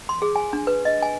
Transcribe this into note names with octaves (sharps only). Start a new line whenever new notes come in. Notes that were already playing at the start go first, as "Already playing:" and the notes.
C6
G#4
G#5
D4
B4
D#5
G#5